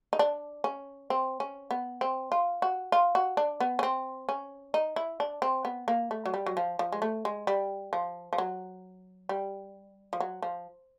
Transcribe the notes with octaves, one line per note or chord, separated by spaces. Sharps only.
D#4
D4
C#4
C4
C#4
B3
C4
F4
F#4
F4
F#4
D4
B3
C#4
C4
C#4
D#4
E4
D4
C4
B3
A#3
A3
F#3
G3
F#3
F3
F3
G#3
A3
G#3
G3
F3
F3
F#3
G3
F3
F#3
F3